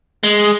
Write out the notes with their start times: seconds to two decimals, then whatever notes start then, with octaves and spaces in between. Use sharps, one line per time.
0.23 G#3